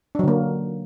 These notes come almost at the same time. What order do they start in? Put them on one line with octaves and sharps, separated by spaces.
D4 F#3 D3 A#3